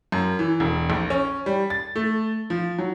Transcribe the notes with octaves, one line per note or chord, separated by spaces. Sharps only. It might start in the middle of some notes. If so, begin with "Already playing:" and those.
F#2
E3
E1
A#1
C#4
G3
A6
A3
F3
F#3